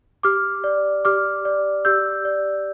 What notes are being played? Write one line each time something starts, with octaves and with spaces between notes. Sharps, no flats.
G4 D6 F6
D5
G4 D6 F6
D5
G4 E6 G6
D5